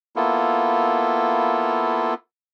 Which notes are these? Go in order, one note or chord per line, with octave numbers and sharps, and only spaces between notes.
A#3 B3 E4 F4 A4